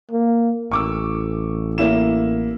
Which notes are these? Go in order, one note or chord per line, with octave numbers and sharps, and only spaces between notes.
A#3
A1 C#6 D6 E6
A#3 E4 E7